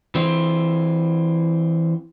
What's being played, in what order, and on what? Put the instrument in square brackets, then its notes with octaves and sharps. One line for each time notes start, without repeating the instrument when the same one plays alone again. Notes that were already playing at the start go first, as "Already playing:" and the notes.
[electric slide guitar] E3 C4